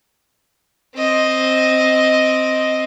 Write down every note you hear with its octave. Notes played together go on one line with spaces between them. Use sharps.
C4 D#5